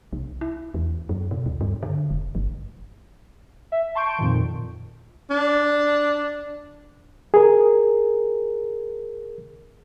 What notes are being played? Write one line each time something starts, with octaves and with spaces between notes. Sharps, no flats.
C2
E4
E2
F#2
B2
D2
G2
D3
F1
G1
E5
A5 C6 C#6 G6 D7
F2 A#2 D#3
D4
G#4 A#4